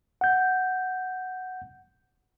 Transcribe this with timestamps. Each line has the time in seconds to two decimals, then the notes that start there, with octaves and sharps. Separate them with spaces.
0.21 F#5 G6